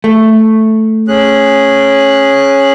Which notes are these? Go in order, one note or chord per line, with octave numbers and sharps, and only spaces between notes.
A3
C#4 G#4 F#6